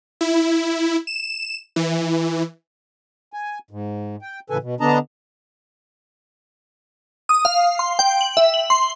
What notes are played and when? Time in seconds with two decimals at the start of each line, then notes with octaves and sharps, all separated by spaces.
0.21 E4
1.07 E7
1.76 E3
3.33 G#5
3.71 G#2
4.22 G5
4.50 A2 C#3 E3 A4 B4 G#5
4.62 B2
4.81 D3 B3 D4 D#5 A5 A#5
7.29 D#6
7.45 F5
7.79 C6
7.99 G5
8.21 F#7
8.37 E5
8.54 F#7
8.70 C6